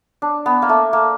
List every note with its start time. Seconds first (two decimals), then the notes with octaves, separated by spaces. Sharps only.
0.22 D4
0.46 B3
0.62 A#3
0.69 A3
0.93 A#3